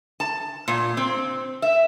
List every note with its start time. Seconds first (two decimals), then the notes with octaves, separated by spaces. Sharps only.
0.20 A5
0.68 A#2
0.97 C4
1.62 E5